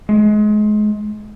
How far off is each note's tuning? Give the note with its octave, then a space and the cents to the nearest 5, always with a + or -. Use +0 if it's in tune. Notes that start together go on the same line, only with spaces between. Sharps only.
G#3 +30